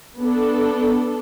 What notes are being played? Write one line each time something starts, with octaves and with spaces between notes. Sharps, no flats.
B3 D4 A4